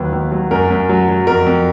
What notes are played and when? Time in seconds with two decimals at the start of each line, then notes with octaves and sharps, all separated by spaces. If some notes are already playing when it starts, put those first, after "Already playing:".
Already playing: D#2 F#3 B4
0.13 D#2
0.32 F#3
0.51 F#2 A#4
0.70 F#2
0.89 F#3
1.09 F#3
1.27 F2 A#4
1.46 F2